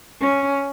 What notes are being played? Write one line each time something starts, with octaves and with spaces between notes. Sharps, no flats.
C#4